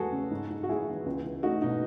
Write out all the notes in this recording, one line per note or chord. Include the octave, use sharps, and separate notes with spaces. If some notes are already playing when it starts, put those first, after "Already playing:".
Already playing: E2 G#3 A3 F#4 G#4 A4
C#3
G#2
G#2
F#4
G#3 E4 G#4
E3
C#2
C#2
A3 D#4 F#4
B2 D#4